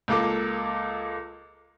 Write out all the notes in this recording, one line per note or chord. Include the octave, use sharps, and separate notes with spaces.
C#2 A#3 A4 D6